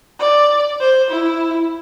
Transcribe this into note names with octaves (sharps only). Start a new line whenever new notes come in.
D5
C5
E4